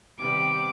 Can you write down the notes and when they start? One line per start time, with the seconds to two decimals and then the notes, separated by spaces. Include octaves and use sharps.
0.18 C3 D#3 G3 B3 D6